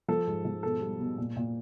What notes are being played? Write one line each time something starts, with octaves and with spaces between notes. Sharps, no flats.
F3 A4
G#2
F3
B2 A4
G3
B2
A#2
A#2